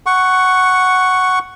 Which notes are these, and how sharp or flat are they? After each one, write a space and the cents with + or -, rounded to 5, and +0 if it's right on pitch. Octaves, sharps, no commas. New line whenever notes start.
F#5 +5 C#6 +0